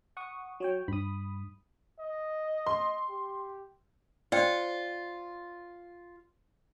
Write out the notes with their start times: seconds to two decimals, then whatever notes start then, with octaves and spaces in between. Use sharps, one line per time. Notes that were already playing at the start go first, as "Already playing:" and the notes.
0.17 F#5 C#6 D#6
0.60 F#3 C#5 G5
0.88 G2 B5 D#6
2.00 D#5
2.67 C6
3.09 G4
4.32 F4 C5 D5 G5